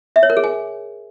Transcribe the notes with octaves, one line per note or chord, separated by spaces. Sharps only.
E5
C#5
A#4
G#4
G#5